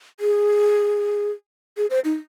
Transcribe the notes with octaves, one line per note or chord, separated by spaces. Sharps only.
G#4
G#4
C5
D#4